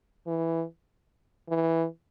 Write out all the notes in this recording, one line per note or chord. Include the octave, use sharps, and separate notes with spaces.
E3
E3